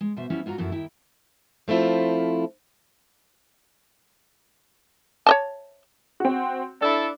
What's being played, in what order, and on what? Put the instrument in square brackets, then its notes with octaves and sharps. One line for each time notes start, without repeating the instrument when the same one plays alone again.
[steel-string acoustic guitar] G#3
B2 C5 E5
F3 G3 B3 C#4 E4
G#2 F4 F#4 A#5
F#2 A#2 F3 E4 A4
D#2 E4 G5
F3 A3 C4 E4 F4
[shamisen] C#5 D#5 A5
[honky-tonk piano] C4 F#4
[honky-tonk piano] D4 [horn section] E4 A4